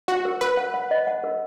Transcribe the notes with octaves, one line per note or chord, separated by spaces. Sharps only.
F#4 F#5
A#4
A#4 B4
F#5
F#5
D#5
F#5
A#4